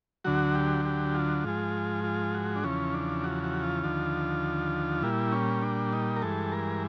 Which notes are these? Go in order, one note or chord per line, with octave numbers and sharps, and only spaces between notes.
D2 D3 F#3 F#4
G4
G4
F4
G#2 F3 G#3
F4
F#4
D4
E2 C#3 F3 C#4
D4
F#4
F#4
F4
D#2 D3 F3
A#2 G3 E4
C#4
D4
D#4
A#4
G2 E3 G#3 A4
A#4